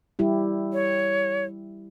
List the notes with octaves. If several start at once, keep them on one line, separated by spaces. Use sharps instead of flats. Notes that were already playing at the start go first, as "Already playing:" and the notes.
G3 E4 G4
C#5